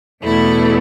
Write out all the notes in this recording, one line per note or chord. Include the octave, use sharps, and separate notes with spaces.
E2 B2 A3 E4